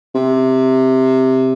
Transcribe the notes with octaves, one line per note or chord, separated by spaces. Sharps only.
C3